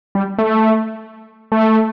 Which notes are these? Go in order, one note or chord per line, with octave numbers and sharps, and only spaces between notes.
G3
A3
A3